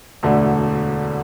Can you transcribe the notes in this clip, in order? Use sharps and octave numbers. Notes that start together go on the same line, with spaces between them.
E1 D2 D3 A3